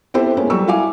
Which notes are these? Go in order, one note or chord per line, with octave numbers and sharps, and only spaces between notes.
B3 C4 E4 G4 A4 C5
G#3 A#3 B3 C#4 E4
F#3 G3 G4 A4 C#6 E6
E4 F#4 F5 G#5 D6